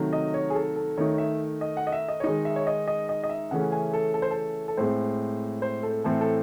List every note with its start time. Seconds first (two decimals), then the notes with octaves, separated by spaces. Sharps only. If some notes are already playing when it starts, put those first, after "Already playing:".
Already playing: C3 D#3 F#3 A3
0.13 D#5
0.34 C#5
0.50 G#4
0.55 A4
0.76 A4
0.97 D#3 A3 D#4 C#5
1.18 E5
1.61 D#5
1.77 F#5
1.87 D#5
1.92 E5
2.08 D#5
2.20 C#5
2.24 D#3 G#3 D#4 D#5
2.45 E5
2.56 C#5
2.67 D#5
2.87 D#5
3.09 D#5
3.24 D#5
3.29 E5
3.51 C#3 E3 A3 C#4 F#5
3.72 G#5
3.93 A4
4.14 A4
4.22 C5
4.31 A4
4.68 A4
4.77 A2 G#3 C4 C5
5.62 C5
5.83 A4
6.04 A2 E3 A3 C4 A4
6.21 A4